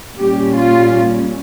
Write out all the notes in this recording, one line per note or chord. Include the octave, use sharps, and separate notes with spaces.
A#2 G3 A#3 C#4 G4
F4